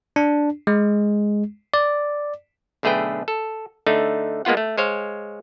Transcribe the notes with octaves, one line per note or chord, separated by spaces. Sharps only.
D4
G#3
D5
B1 D3 A3 G#4 B4 G5
A4
D3 A3 D#4
G#3 A#3 B3 F4 F#5
A3
G#3 C5 C#5 F5